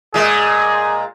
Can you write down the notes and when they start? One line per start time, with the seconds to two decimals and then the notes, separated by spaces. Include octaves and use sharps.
0.14 A#2 G#3 G#4